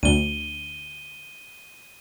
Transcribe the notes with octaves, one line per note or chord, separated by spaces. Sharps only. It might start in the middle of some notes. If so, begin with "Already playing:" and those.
D2 D#7 G7